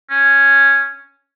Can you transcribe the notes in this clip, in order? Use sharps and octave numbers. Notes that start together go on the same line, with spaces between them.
C#4